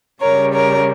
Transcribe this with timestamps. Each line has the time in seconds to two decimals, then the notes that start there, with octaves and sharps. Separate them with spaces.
0.21 C#3 G3 A#4 C#5
0.54 A#4 C#5